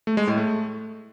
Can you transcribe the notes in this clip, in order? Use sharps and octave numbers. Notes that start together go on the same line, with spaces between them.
A3
G#3
A2
A3